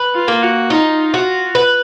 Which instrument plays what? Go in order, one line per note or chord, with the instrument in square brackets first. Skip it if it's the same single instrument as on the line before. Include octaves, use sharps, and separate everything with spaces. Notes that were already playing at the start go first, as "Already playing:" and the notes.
Already playing: [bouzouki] B4
[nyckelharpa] F4
[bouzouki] A#3
[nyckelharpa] F#4
[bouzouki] D#4 [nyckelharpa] F4
[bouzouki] F#4
B4